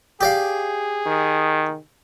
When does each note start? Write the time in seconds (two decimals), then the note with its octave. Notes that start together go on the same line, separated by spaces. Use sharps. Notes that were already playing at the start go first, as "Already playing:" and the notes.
0.21 G4 G#4 D5 F5
1.06 D#3